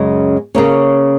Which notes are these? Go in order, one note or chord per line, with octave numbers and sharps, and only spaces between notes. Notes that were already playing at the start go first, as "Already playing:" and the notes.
Already playing: F#2 C#3 G#3 C#4
C#3 A#3 C#4